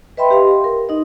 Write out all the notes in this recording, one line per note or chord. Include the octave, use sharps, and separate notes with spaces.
B4 D#5 E5 G5 B5 C6
G4 F5 C6
C6
A#4
D#4 D#5